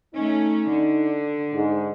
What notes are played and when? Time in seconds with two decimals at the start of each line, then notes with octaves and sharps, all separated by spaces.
0.15 A3 C#4 D#4
0.72 D3
1.53 G#2